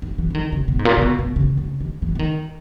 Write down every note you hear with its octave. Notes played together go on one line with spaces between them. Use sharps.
D#3
E3
E3
D#3
C#3
B2
G#2
A#2
C#3
B2
B2
C#3
C#3
D#3
E3
E3
D#3